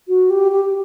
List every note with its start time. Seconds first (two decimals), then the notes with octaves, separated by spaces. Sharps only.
0.08 F#4
0.30 G4
0.52 G4